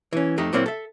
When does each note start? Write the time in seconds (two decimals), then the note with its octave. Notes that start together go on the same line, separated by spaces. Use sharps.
0.13 E3 C#4
0.38 F2 A3 D#4 G4
0.53 A#2 F#3 A#3 C4 E4
0.66 A4 E5